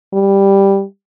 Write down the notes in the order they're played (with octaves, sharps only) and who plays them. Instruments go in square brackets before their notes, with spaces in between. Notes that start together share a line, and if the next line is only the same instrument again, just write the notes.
[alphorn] G3